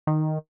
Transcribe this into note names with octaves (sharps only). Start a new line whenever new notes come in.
D#3